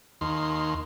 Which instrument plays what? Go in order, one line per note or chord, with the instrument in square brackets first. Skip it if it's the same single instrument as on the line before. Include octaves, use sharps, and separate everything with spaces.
[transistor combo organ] D#2 C6